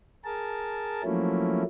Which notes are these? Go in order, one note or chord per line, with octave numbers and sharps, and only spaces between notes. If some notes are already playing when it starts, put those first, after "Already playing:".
G#4 A#4 A5
F3 F#3 A3 A#3 C#4 E4